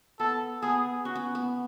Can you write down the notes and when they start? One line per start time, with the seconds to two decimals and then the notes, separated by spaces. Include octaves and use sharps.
0.19 B3 A4
0.62 B3 G#4
1.05 C#4 F#4
1.15 B3
1.35 B3